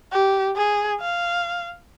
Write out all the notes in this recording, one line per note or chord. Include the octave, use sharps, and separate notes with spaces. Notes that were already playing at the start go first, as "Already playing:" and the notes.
G4
G#4
F5